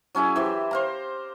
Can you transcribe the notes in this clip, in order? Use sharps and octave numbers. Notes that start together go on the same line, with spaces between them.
F#3 C#4 E4 G#4
E3 G4 C5
C5 F5 A#5